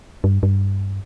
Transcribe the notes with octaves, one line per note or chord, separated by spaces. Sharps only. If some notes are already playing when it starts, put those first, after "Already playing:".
G2
G2